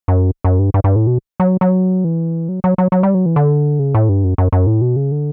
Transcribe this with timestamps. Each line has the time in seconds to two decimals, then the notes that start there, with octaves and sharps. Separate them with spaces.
0.08 F#2
0.44 F#2
0.59 G2
0.74 G2
0.84 G2
0.96 A2
1.07 B2
1.40 F#3
1.61 F#3
2.04 E3
2.49 F#3
2.64 F#3
2.78 F#3
2.92 F#3
3.03 G3
3.14 F#3
3.26 E3
3.36 D3
3.79 C#3
3.95 A2
4.09 G2
4.24 F#2
4.38 F#2
4.52 F#2
4.67 A2
4.81 B2
4.96 C#3
5.12 D3